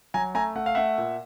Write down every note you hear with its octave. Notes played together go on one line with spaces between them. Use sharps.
F#3 G#5 A#5
A3 G#5 A#5
A3 F#5
F5
A3 E5 F#5
A#2